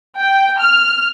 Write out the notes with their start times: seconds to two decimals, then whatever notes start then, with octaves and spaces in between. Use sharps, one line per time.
0.19 G5
0.59 F6